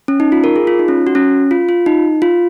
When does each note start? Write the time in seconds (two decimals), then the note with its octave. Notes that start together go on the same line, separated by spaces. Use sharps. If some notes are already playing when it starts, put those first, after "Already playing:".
0.08 C#4
0.20 D#4
0.32 F4
0.44 A#4
0.56 G#4
0.67 F4
0.79 D#4
0.88 C#4
1.07 F#4
1.15 C#4
1.51 F4
1.69 F4
1.86 D#4
2.22 F4